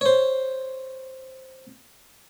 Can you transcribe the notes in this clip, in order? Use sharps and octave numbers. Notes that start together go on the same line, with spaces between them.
C5 C#5